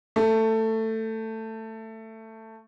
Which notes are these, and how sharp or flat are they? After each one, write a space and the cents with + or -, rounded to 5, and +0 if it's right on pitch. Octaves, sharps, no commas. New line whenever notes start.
A3 +15